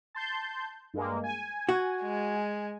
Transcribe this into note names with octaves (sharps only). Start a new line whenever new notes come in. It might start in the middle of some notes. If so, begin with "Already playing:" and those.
A5 C6 G6
G2 G#3 A#3
G#5
F#4
G#3